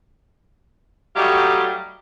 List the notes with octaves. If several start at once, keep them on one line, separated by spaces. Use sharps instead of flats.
F#3 G3 A3 D#4 G4 F5